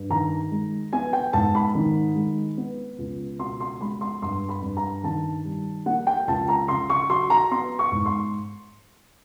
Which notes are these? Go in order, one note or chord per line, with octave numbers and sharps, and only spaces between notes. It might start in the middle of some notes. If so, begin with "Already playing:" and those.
Already playing: G2
D#3 A#5
G#3
B3 G#5
G5
G#2 A5
B5
D#3
G#3
B3
C#2
B2 C6
C6
G#3 B5
C6
G2 C6
B5
G2
A#5
D#3 A5
G3
A#3 F#5
G5
C#2 A5
A#5
C#3 C6
C#6
F#3 C6
A#5
B3 C6
C#6
G#2
C6